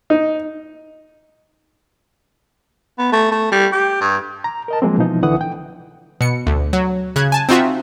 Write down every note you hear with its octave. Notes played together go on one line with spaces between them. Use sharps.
D#4
B3
A3
A3
G3
G4
G2
A#5
A#4 D#5 A5
F3 F#3 G#3 A#3 C4
B2 E3 F3 D#4
C2 D3 E3 F#5 D#6
G5
B2 C#7
D2
F#3
C#3 F#6 G#6
G#5 A5
C4 D#4 F4 F#4 E5